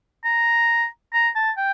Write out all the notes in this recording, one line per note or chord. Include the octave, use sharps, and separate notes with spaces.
A#5
A#5
A5
G5